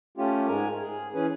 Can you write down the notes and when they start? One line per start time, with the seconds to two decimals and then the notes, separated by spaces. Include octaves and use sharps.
0.17 A3 C#4 F4 G4
0.47 G#2 G#3 A#4 G#5
0.81 G#4
1.14 E3 C#4 G#4 B4